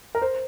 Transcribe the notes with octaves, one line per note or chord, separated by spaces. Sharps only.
A#4
C5